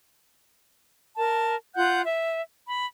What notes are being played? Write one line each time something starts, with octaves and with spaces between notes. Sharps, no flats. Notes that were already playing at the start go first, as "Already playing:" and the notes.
A#4 A5
F4 F#5 F#6 G6
E5
B5